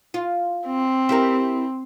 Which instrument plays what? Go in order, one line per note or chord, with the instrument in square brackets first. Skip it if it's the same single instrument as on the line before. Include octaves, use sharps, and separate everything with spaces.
[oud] F4
[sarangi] C4
[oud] E4 G4 A#4